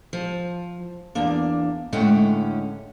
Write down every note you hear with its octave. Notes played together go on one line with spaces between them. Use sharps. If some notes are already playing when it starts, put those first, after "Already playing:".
F3
E2 A#3 D4
A2 D3 G#3 C#4 F#5 G5